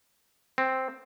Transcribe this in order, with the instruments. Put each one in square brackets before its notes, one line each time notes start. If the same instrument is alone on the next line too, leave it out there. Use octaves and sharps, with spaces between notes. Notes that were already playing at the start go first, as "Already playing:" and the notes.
[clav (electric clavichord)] C4